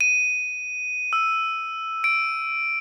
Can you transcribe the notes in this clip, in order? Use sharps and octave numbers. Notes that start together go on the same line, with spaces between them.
D#7
E6
D7